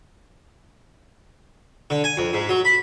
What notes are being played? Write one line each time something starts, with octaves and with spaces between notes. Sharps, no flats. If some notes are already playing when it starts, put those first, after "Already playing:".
D3
G#5
F2
G#2
F#3
B5